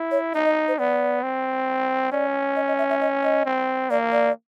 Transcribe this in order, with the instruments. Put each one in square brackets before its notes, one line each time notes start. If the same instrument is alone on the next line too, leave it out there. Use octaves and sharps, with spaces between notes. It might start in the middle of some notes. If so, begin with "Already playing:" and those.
Already playing: [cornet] E4
[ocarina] C#5
[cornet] D#4 [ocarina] D#5
[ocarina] D#5
C5
[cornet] B3 [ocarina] D5
[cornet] C4
[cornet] C#4 [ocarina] D5
[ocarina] D#5
D#5
E5
E5
D#5
D#5
[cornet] C4
[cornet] A#3 [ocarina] D5
[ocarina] D5